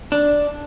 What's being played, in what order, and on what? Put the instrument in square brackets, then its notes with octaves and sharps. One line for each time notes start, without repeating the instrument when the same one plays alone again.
[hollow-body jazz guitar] D4